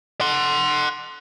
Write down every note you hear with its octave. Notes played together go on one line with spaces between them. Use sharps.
F#5 C6